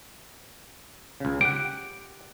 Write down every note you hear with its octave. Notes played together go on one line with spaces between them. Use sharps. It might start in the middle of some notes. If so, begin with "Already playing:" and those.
C#2 C#3
G4 F#5 D7